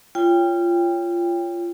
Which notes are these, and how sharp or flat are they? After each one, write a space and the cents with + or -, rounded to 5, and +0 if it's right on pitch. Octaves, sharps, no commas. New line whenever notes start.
F4 -20 C#5 +10 G5 +20